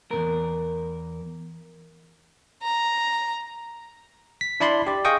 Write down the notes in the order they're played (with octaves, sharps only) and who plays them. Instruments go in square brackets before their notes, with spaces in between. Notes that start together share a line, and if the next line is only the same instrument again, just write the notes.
[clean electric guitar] E2 A#2 A#4
[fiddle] A#5
[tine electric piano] B6
D4 E4 D5 B5 C6
G4 D5
G#4 D#5 F5 G5 C#6 D#6